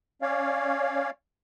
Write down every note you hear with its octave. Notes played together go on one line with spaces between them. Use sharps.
C#4 C#5 D5 F5